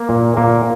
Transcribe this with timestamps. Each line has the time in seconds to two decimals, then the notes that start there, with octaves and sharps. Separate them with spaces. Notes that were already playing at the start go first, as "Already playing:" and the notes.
Already playing: A#3
0.09 A#2
0.37 A#2 A#3